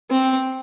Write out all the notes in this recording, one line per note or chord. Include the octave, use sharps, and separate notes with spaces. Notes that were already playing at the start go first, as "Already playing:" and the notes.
C4